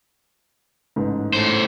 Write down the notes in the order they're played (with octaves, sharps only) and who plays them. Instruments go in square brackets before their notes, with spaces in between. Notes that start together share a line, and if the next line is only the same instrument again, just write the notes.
[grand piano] A1 G#2
[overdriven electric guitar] A2 C5